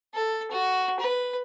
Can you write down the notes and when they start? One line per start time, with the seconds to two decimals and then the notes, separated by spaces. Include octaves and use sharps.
0.14 A4
0.51 F#4
1.00 B4